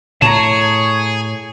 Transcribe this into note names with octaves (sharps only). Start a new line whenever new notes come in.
A2 G#4 C#5 A5 A#5